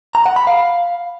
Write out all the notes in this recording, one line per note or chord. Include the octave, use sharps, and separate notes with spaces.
A#5
F#5
B5
F5